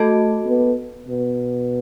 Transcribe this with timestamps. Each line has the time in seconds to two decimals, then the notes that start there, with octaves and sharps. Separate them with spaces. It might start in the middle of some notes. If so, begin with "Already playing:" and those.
Already playing: A3 F#4 A4 D#5 A5
0.46 B3
1.08 B2